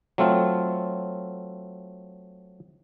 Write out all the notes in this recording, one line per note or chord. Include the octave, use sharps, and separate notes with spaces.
F#3 A3 C4 F4